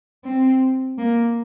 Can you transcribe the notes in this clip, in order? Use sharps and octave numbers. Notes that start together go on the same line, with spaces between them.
C4
A#3